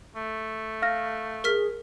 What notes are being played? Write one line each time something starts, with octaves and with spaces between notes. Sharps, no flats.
A3
F5 F6 A#6
G#4 A#4 F6 B6